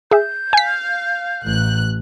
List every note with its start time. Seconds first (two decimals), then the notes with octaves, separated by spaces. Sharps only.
0.11 G#4 E5 G6
0.53 F5 G#5 B6
1.42 A1 F#6